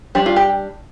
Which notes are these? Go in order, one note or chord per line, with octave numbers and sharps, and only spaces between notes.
G3 D4 G4
F4
G4